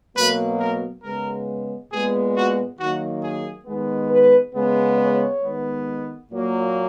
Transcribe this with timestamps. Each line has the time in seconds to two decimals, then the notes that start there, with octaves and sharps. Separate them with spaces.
0.15 B2 F#3 A#3 B4
0.59 A#4
1.02 C#3 G#3 B3 A#4
1.90 A#2 G#3 B3 G#4
2.34 F#4
2.78 D#3 F#3 A#3 F#4
3.22 G#4
3.66 D#3 G#3 B3
4.10 B4
4.54 C#3 G#3 B3
4.98 C#5
5.41 D#3 G#3 B3
6.29 A#2 F#3 A#3